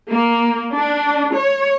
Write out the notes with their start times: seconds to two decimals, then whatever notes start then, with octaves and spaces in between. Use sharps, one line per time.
0.12 A#3
0.74 D4
1.36 C#5